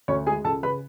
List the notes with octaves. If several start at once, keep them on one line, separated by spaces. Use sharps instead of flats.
D2 C#4 C#5
G#3 G#4 G#5
C#2 A4 A5
C#3 B4 B5